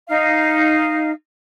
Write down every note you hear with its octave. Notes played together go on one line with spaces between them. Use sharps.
D#4 F5